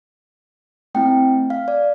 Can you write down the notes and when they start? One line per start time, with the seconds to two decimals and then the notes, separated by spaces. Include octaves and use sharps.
0.95 A3 C4 E4 G5
1.50 F5
1.68 D5